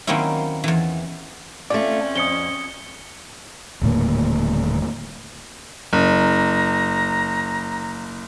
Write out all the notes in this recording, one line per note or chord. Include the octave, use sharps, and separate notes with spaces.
D#3 F#3 A#3 C4 C#4 E4
E2 E3
A3 C4 C#4 F4 D5
F2 D#6 C#7 G7
D#1 A2 D3 A#3
F#1 A#5